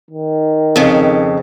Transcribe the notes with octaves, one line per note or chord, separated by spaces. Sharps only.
D#3
F2 C#3